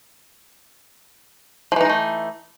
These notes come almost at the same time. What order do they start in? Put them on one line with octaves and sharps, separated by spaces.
F3 E3 D#4 G#3 A3